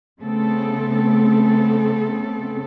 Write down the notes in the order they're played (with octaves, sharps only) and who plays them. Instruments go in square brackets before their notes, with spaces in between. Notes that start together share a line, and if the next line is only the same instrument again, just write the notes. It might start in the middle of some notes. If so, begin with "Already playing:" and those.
[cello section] C#3 A3 B3 C4 A4